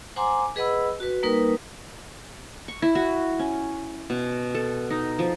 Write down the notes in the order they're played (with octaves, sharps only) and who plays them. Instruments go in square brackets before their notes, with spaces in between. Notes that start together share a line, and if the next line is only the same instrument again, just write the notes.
[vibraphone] C5 F#5 G#5 A#5 C6 D6
G#4 B4 D#5 F#5 B5 E6
F#4 B4
G3 A#3 D#4 A#4 B4 D#6
[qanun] C#6
E4
F#4
C#4
B2
A4
D#4
F3